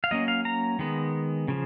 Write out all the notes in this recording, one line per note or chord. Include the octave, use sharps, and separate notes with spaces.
F5
F#3 A#3 C#4 D#5
F5
A#5
D#3 G#3 B3
C#3 F3